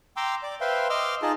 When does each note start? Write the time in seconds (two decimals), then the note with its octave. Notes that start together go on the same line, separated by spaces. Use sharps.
0.17 G5 A#5 C6 D6 E6
0.43 D5 D6
0.61 B4 C5 E5 F5 G5 C6
0.90 D#5 C6 D6 E6 F6
1.22 D#4 F4 G#4 D#5 A5